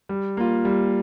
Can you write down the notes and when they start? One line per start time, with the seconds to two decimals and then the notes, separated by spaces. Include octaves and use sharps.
0.09 G3
0.37 A#3 F4
0.65 G3